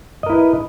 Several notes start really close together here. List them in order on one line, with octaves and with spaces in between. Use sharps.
D#5 A#4 E4 B4